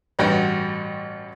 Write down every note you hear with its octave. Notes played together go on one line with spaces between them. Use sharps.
A1 G2 F#4 G5